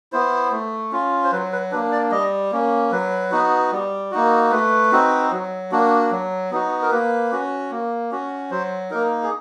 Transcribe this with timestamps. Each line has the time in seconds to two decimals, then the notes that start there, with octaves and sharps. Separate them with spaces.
0.13 B3 E4 C5
0.52 A3
0.92 C#4 F4
1.24 C5
1.32 F#3 B4
1.52 B4
1.72 A#3 D4 B4
1.92 D5
2.11 G3 D#5
2.52 A#3 C#4
2.91 F#3 B4
3.32 B3 D#4 F#4
3.72 G3
4.12 A#3 D#4 F#4
4.51 A3 B4
4.92 C4 D#4 F#4
5.31 F#3
5.72 A#3 D4 F#4
6.11 F#3
6.51 B3 D#4 F#4
6.82 A#4
6.91 A#3 B4
7.32 C#4 F#4
7.71 A#3
8.11 C#4 F#4
8.51 F#3 C5
8.90 A#3 D#4 A#4
9.23 G#4